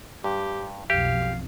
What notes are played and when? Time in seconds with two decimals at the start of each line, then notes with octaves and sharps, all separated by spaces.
0.24 G2 G4
0.90 B1 F2 G4 F5